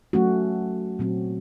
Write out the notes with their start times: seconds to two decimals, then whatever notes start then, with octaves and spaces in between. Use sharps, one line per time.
0.13 F#3 A3 C#4 F#4
0.99 A#2 F#3 C4 F#4